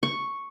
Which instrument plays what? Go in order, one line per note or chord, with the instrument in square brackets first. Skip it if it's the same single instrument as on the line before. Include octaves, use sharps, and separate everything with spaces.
[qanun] C#6